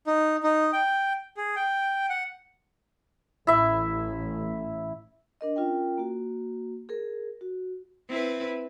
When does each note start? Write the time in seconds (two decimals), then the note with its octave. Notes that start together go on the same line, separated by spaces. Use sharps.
0.07 D#4
0.43 D#4
0.73 G5
1.37 G#4
1.56 G5
2.10 F#5
3.47 A1 E4 E5
5.41 D4 A#4 D#5
5.56 C#4 F4 A#4 G5
5.98 A#3 F#4
6.89 G#4 A#4
7.41 F#4
8.08 C4 E4 B4